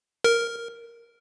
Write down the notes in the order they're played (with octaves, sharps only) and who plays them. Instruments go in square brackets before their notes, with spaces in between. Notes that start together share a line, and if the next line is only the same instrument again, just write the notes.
[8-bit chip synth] A#4